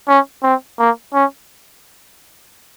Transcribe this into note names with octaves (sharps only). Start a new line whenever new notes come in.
C#4
C4
A#3
C#4